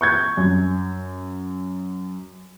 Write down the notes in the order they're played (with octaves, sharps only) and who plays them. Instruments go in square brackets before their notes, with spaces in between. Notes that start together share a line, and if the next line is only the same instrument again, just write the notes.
[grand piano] C#6 G6 G#6
F#2